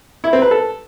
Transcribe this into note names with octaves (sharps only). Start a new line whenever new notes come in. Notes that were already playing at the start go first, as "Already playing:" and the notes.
E4
C4
B4
A4